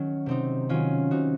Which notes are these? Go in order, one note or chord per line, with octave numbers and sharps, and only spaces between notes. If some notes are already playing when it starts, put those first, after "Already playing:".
Already playing: D#3 F#3 C#4
C3 C4 D#4
D#3 F#3 C#4 F4
C3 D#4 F#4